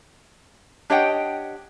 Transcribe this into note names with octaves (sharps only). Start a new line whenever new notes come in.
D4 G4 C#5 D#5 F#5 G5